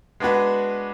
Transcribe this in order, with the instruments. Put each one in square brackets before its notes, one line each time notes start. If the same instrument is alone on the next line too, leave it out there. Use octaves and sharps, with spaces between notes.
[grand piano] G#3 B3 D4 F#4 B4